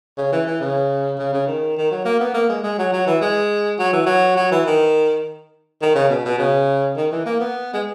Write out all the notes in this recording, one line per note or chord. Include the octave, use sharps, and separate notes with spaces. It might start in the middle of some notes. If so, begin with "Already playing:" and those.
C#3
E3
E3
C#3
C#3
C#3
D#3
D#3
F#3
A#3
B3
A#3
G#3
G#3
F#3
F#3
E3
G#3
F#3
E3
F#3
F#3
E3
D#3
D#3
C#3
B2
B2
C#3
D#3
E3
A#3
B3
G#3